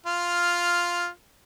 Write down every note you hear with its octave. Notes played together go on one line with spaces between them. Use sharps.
F4 F6